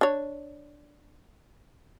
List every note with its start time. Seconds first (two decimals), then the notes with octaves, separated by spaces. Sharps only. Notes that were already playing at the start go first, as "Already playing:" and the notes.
0.01 D4 C#5